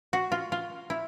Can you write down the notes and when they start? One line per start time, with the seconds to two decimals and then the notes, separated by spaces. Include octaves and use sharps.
0.13 F#4
0.32 F4
0.52 F4
0.90 E4